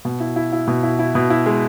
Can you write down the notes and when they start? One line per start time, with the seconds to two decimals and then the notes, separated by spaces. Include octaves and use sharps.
0.05 B2
0.20 E4
0.36 E4
0.53 E4
0.68 B2
0.83 E4
0.99 E4
1.15 B2
1.30 E4
1.46 G#3